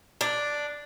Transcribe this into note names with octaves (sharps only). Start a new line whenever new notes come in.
D4